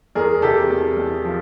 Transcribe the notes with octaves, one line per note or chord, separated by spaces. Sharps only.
E2 G#4 A#4
C3 G4 A4
E2
E2
F3